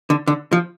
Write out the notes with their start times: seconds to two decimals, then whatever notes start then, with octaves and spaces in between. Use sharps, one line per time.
0.10 D3
0.27 D3
0.53 F3